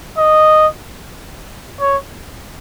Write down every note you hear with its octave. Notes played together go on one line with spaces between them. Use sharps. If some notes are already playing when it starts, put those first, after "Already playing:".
D#5
C#5